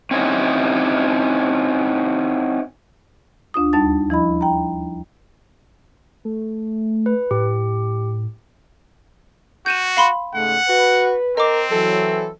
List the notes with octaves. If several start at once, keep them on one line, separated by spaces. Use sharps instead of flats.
C4 C#4 D#4 E4 F#4
D2 D4 F4 D#6
D#2 G3 D4 D#4 A5 A6
F3 E4 D#5 B5
G5 A#5
A3
B4
A2 G4
F#4 G6 D#7 E7
F5 B5 C6
G#2 C#3 A3 F#5
F#4 B4
C4 A#4 D#5 D6
E3 F#3 A4